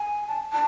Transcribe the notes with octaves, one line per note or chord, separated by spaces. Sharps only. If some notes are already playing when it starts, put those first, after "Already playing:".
Already playing: G#5
A5
A5